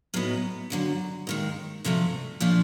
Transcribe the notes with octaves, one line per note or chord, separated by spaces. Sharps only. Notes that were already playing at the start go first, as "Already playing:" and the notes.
A2 F#3 B3 D#4
D#2 D3 F#3
D#2 D#3 G#3
D2 C3 F3 A3
A#2 F3 A3 D4